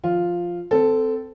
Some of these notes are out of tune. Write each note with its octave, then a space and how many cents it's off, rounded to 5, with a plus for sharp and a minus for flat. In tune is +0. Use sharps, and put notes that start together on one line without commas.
F3 +0 F4 +0
C4 -20 A4 +0